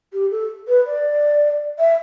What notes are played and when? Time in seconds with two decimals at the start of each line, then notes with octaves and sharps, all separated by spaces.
0.13 G4
0.31 A4
0.68 B4
0.87 D5
1.79 E5